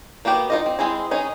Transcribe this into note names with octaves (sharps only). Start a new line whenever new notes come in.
A#3 B3 F#4 G4
D#4 F4 D#5
C4
G#3 C4 E4 G#4
C#4 D#4 G#4